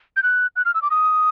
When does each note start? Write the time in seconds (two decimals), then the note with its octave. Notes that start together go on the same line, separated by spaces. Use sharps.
0.16 G6
0.23 F#6
0.56 F#6
0.65 F6
0.74 E6
0.82 D6
0.90 D#6